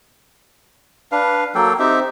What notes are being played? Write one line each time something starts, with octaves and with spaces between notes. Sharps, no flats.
D4 B4 F5
F#3 A#3 A4 G5
C4 D#4 G4 E5